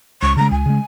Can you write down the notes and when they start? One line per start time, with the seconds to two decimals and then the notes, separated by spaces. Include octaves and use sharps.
0.22 C#2 C#6
0.37 C#3 G#3 A#5
0.51 C#2 G#5
0.66 C#3 G#3